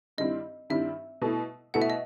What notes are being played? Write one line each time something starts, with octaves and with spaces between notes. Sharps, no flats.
G2 D#3 G3 C4 E4 D#5
G2 D#3 G3 C4 E4 E5
B2 A3 E4
B2 A3 E4 F#5
E5
D#5